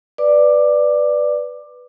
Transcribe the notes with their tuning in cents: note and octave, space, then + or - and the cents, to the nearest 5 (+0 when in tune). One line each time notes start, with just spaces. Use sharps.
B4 +0 D5 +5 D6 +15